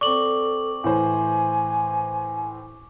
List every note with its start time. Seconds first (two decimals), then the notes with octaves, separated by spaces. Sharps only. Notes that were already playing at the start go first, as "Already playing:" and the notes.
0.01 C4 A4 D5 C#6 D6 F#7
0.84 A2 E3 C5 G#5